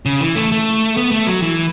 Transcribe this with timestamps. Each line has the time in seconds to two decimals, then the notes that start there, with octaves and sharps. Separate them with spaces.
0.05 C#3
0.21 E3
0.36 A3
0.52 A3
0.97 B3
1.11 A3
1.27 F#3
1.42 E3